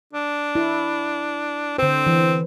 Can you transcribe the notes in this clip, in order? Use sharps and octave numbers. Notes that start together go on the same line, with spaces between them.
D4
E4
D3 C4 C5
E3